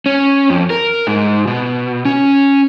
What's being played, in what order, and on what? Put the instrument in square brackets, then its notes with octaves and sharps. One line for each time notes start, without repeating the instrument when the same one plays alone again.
[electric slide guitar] C#4
F2
A#4
G#2
B2
C#4